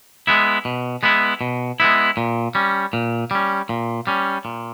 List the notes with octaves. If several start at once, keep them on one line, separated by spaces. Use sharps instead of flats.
G#3 B3 E4
B2
G#3 B3 E4
B2
G#3 B3 E4
A#2
G3 C#4
A#2
G3 C#4
A#2
G3 C#4
A#2